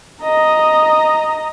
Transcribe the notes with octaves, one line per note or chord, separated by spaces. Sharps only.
D#5 A#5